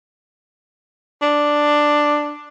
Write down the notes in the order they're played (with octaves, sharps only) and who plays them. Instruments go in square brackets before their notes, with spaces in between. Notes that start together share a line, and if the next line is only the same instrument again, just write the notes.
[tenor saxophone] D4